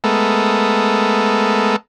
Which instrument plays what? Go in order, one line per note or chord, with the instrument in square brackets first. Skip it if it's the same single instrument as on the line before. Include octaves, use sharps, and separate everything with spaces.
[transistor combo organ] G#3 A3 B3 A4 A#4